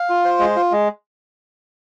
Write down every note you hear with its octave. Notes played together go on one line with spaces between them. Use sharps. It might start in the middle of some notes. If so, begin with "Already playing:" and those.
Already playing: F5
F4
C5
G#3
F4
G#3